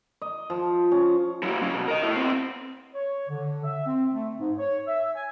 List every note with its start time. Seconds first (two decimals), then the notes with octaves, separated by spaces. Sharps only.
0.21 D#5
0.50 F3
0.92 C#4
1.43 F#3 E4
1.61 C#2 C#4
1.74 B2
1.88 A#4 D#5
2.03 E4 A4
2.16 B3 C4
2.95 C#5
3.29 D3
3.63 E5
3.86 C4
4.11 A3
4.38 G#2
4.58 C#5
4.87 E5
5.15 G#5